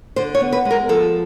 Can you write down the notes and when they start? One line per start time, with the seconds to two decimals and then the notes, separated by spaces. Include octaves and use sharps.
0.16 D3 C5
0.35 C#5
0.41 B3
0.53 B4
0.65 G#3
0.71 A#4
0.89 F3 A4